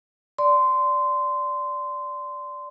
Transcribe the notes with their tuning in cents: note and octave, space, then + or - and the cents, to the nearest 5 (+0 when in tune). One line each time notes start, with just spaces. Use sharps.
D5 -10 C6 -15